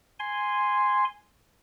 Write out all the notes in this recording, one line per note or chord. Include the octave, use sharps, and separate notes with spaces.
G#5 C6